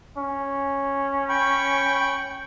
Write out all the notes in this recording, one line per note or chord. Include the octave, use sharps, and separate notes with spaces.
C#4
G5 B5 C#6